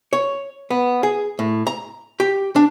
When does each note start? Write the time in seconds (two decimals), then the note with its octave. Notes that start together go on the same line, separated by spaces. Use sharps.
0.13 C#5
0.70 B3
1.03 G#4
1.39 A2
1.67 A#5
2.20 G4
2.56 D4